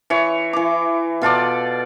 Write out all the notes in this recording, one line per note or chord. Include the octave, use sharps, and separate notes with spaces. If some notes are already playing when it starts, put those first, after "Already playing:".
E3 C#5
E3 D6
B2 F4 A4 D5